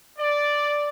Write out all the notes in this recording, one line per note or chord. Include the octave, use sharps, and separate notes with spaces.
D5